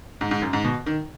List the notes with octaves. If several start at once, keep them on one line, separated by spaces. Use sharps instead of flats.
G#2
G#2
F#2
G#2
B2
D#3